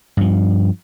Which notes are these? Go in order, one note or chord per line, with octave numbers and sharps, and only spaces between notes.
G2 F3